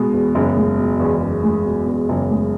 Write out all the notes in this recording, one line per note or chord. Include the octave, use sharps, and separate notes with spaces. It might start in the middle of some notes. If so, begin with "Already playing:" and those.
Already playing: B2 G#3
E2
F#1
G#3
B2
E2
F#1
G#3
B2
E2
F#1
G#3